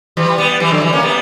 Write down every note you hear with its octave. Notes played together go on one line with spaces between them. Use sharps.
E3 G3
G3 B3
E3 G3
D3 F#3
E3 G3
A#3 C#4
G3 B3